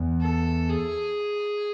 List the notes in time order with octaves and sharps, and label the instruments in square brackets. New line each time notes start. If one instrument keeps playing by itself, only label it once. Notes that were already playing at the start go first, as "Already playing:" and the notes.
Already playing: [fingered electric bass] E2
[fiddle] A4
G#4